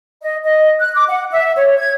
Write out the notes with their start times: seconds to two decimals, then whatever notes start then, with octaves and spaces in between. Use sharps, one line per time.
0.21 D#5
0.44 D#5
0.80 F#6
0.95 D6
1.09 F#5
1.31 E5
1.55 C#5
1.78 G#6